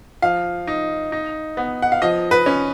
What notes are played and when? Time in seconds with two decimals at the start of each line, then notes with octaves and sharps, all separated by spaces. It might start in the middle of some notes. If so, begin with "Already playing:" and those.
0.22 F3 F5
0.67 D#4
1.12 D#4
1.57 B3
1.82 F#5
1.92 F5
2.02 F3 D#5
2.31 B4
2.46 C#4